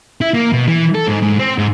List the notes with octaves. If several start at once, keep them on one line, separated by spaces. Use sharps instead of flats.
E4
A#3
B2
E3
A4
G#2
G#2
C4
G#2